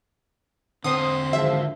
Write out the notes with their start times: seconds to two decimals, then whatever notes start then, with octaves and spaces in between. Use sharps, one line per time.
0.84 D3 C4 C5 D#6
1.33 G#1 F3 E5